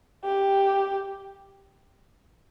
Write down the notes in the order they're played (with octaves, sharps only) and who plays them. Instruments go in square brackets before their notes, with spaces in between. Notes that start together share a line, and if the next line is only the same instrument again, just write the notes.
[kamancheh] G4